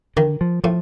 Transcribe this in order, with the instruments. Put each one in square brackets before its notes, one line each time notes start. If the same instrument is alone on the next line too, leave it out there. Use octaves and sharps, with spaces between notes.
[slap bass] D3 [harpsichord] D#3
[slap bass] F3
[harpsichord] A2 [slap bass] F3